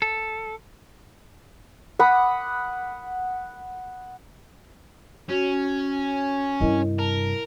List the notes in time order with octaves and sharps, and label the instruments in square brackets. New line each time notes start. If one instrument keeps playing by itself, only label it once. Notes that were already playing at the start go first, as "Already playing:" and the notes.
[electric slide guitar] A4
[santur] F#5 B5 D6 D#6
[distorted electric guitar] C#4 [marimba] F#4
[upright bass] G2 C3 [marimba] E4 A#4 D#5
[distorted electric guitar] A#4 [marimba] A5